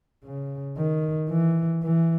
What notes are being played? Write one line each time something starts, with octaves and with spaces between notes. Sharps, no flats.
C#3
D#3
E3
E3